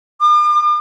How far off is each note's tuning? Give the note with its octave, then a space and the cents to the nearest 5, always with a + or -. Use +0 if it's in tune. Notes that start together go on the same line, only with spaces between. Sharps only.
D6 +45